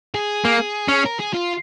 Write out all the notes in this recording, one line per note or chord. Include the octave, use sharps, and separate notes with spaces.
G#4
A#3
C#4
A#4
G#4
F4